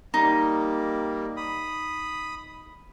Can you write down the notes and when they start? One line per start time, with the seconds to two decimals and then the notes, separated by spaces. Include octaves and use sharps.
0.14 G3 A#3 D#4
1.37 B5 D#6